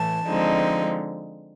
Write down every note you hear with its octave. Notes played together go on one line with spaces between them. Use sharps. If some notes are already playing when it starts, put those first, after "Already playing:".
Already playing: A2 E3 A5
D3 F3 G#3 C4 D#4